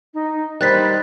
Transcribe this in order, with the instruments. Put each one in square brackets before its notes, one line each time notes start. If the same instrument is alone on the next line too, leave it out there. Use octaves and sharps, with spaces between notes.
[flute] D#4
[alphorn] D#3 [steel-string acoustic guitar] G3 D4 B4 [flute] C5 [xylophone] F#6 A6 B6